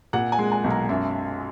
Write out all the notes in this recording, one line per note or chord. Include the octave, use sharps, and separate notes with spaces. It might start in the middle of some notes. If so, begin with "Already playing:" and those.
A#2 F#5
G#5
G#3
G#5
B1
A#5
F#2 E5